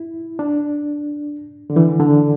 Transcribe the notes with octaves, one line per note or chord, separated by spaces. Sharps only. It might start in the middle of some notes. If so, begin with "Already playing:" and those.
Already playing: E4
D4
D3
E3
D3